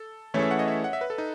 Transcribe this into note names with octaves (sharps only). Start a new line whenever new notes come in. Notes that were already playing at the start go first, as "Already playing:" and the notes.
Already playing: A4
E3 A3 C#4 E4 G#4 C#5
E5
F#5
D#5
E5
F#5
E5
B4
A4
D#4